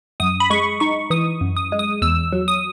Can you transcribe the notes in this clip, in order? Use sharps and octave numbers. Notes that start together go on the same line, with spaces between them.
F#2 D#6
B5
G#3 C#6
D#4 C#6
E3 D#6
F#2
D#6
G#3
D#6
E2 E6
F#3
D#6